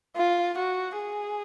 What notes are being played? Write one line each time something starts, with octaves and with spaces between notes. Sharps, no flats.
F4
F#4
G#4